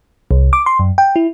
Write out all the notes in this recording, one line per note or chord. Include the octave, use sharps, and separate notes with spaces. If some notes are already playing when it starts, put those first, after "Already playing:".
C2
D6
C6
F#2
G5
E4